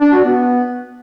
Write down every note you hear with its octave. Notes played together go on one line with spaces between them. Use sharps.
D4
F#4
B3